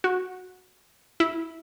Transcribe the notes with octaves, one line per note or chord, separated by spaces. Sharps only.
F#4
E4